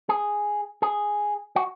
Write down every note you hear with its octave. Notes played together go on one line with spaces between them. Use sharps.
G#4
G#4
F#4